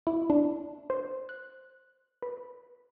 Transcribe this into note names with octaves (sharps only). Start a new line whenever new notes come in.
E4
D4
C5
F#6
B4